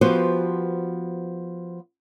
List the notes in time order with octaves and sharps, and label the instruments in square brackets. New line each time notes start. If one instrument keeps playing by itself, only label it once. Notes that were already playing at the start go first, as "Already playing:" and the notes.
[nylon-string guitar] F3 B3 F#4 G4 B4 C5